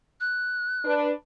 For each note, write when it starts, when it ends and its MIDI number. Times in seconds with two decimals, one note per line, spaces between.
0.20 0.93 90
0.85 1.10 62
0.85 1.10 71